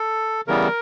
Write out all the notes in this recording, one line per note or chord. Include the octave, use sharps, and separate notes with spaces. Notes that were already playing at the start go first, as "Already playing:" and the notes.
Already playing: A4
C#3 E3 G3 B3 A#4